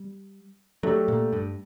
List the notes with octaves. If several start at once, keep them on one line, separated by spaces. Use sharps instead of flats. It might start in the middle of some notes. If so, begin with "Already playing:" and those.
Already playing: G3
F#3 A3 D4 G4
A#2
G2